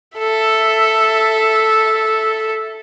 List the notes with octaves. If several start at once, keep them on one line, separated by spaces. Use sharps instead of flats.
A4 E5